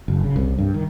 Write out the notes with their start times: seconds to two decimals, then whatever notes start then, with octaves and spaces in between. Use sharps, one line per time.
0.08 F#1
0.24 C#3
0.36 C2
0.58 G2
0.74 D#3